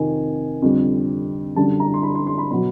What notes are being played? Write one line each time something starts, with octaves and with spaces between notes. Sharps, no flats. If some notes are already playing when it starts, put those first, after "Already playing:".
Already playing: F2 C3 D#3 G#5
F2 D3 G3
F#2 D3 G3 A5
A#5
C6
B5
C6
C6
B5
B2 F#3 B5